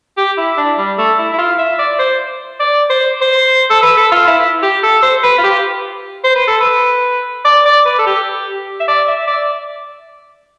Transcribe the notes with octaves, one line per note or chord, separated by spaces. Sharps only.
G4
E4
D4
G3
A3
E4
E4
F4
E5
D5
C5
D5
C5
C5
A4
B4
A4
F4
E4
G4
A4
C5
B4
F4
G4
C5
B4
A4
B4
D5
D5
B4
A4
G4
E5
D5
E5
D5